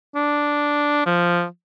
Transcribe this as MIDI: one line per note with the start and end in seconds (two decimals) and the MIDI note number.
0.15 1.05 62
1.06 1.44 53